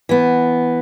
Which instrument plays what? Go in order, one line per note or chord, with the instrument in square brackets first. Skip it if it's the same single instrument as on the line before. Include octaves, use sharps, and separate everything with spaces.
[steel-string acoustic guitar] E3 B3